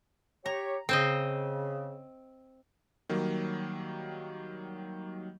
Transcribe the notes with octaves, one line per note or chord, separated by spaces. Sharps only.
G4 C#5 A#5
C#3 C4 C5 D#5
D#3 F#3 G3 A#3